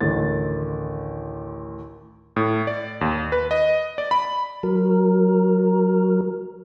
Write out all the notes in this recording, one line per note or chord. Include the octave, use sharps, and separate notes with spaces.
A1 D2 D#3 A6
A2
D5
D#2
B4
D#5
D5
B5
F#3 A#4